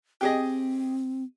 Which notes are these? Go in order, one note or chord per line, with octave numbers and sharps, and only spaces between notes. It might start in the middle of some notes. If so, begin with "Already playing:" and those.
C4 G4 G#4 D#5